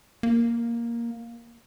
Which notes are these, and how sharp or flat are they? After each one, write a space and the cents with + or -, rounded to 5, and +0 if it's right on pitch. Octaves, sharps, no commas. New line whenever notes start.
A#3 +5